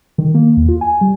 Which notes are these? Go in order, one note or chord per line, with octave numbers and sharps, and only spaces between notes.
D#3
A#3
E2
F4
G#5
G3